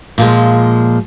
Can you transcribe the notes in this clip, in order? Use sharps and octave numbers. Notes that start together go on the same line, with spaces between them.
A#2 F3 G#3